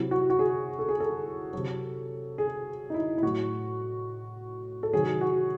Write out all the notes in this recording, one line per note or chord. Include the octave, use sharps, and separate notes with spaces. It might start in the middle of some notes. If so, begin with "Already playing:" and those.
Already playing: C3 F#3 E4
F#4
F#4
G#4
A4
G#4
A4
C3 F#3
G#4
D#4
E4
E4
A2 F#3 F#4
A4
C3 D#3 F#3 G#4
F#4